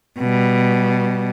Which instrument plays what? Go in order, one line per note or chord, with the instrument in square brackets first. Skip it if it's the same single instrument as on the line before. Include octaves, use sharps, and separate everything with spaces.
[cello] B2 G3